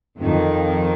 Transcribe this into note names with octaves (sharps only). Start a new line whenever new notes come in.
F2 D#3